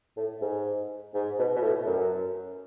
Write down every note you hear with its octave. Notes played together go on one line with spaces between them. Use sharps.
A2
G#2
G#2
B2
B2
A2
F#2